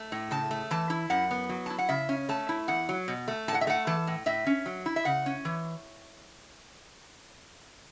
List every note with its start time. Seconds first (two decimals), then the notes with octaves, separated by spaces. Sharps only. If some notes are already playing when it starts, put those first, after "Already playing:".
Already playing: A3
0.12 A2
0.31 C#3 A5
0.51 A3
0.71 E3 A5
0.90 E4
1.10 F#2 F#5
1.31 B3
1.49 F#3
1.66 E4 A5
1.78 F#5
1.89 C#3 E5
2.09 C#4
2.29 A3 A5
2.49 E4
2.68 E2 F#5
2.89 F#3
3.08 B2
3.28 A3
3.48 A2 A5
3.54 F#5
3.61 E5
3.67 A3 F#5
3.87 E3 A5
4.07 A2
4.26 A2 E5
4.47 C#4
4.66 F#3
4.86 E4
4.96 E5
5.05 C#3 F#5
5.26 C#4
5.45 E3